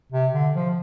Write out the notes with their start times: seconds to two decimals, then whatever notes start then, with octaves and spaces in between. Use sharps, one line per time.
0.12 C3
0.33 D3
0.54 F3